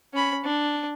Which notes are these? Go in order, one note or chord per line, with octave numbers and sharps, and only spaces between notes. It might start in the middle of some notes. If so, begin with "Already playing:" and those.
C#4 B5
D4